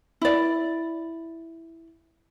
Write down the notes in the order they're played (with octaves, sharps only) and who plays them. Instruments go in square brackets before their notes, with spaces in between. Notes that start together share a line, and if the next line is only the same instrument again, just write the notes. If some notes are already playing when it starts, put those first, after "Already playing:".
[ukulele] E4 D5